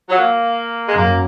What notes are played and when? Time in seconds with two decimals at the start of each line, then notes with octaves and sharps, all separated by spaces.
0.09 F#3
0.18 A#3
0.87 G#3
0.96 F#2 A#3